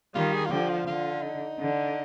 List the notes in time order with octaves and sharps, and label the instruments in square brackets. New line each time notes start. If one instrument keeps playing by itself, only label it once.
[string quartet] D#3 G3 [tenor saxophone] F4
[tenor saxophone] G#4
F4
[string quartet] D3 F3 [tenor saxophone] G4
[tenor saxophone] F4
[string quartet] D3 [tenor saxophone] F4
[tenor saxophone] D#4
[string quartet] D3